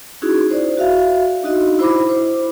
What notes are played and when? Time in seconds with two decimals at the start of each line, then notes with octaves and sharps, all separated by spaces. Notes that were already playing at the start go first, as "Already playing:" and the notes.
0.22 C#4 D#4 E4 F#4 G#4
0.50 C5 D5
0.77 F#4 E5 F5
1.43 D4 D#4 F#4 D#5
1.79 E4 C5 B5 D6
2.09 C5